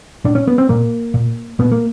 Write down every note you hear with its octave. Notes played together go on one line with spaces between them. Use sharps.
A#2 D4
C#4
B3
C4
A#2 A#3
A#2
A#2 B3
A#3